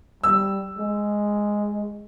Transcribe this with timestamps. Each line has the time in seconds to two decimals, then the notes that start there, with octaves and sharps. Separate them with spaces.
0.24 G3 E6
0.77 G#3